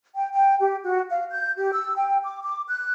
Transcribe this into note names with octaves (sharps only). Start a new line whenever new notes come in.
G5
G5
G4
F#4
F5
G6
G4
E6
G5
D6
D6
F#6